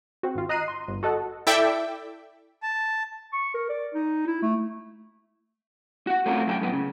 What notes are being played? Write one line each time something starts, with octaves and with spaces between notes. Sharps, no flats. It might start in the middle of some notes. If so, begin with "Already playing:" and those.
C4 F#4
G#1 F4
D#5 A#5 F#6 C7 D#7
C6
G1
F#4 A4 D#5 F#5 A5
E4 A4 D5 E5 G5 D6
A5
C#6
A#4
D5
D#4
E4
A3
F#4 F#5
A3 C4 C#4 F4 F#4 A#4
F#2 A4 G5
F#2 A2 B3
C#3